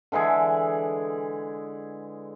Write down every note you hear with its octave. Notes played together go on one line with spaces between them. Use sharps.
D3 E3 G#3 G#4